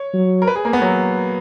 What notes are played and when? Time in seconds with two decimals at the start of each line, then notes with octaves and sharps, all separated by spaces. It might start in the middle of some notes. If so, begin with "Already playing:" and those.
Already playing: C#5
0.13 F#3
0.42 A#4
0.47 B4
0.55 G#4
0.65 A#3
0.73 B3
0.82 F#3